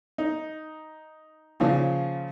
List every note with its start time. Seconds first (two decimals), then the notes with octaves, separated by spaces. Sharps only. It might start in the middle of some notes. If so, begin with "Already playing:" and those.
0.18 D#4
1.60 A#2 C#3 F3